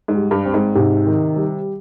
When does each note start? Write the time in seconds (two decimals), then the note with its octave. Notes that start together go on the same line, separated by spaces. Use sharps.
0.08 G#2
0.15 G3
0.31 G2
0.45 C4
0.54 G#2
0.75 G#2 C3
1.06 D#3
1.36 G3